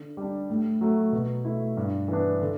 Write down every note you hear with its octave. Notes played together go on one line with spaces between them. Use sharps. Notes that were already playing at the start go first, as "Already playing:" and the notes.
Already playing: D3
G3 D4
A2
F#3 A3
B2
A3 E4
G2
E3 B3 D4
D3